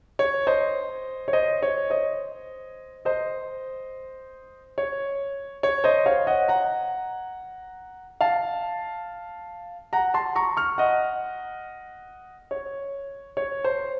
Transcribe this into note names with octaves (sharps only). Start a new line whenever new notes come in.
C#5
C5 D#5
C#5
C5 D#5
C#5
C5 D#5
C5 D#5
C#5
C#5
C5 D#5
C#5 F5
D#5 F#5
F#5 A#5
F5 A5
F#5 A#5
A5 C6
A#5 C#6
C#6 F6
D#5 F#5
C#5
C#5
C5